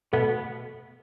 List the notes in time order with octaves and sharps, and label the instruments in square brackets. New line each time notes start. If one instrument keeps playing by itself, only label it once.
[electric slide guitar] B2 B3 [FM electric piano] A3